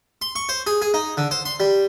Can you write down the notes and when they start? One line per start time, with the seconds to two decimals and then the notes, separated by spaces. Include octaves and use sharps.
0.22 C6
0.36 C#6
0.49 C5
0.67 G#4
0.82 G#4
0.94 D#4
1.17 D3
1.31 C5
1.45 C6
1.60 G3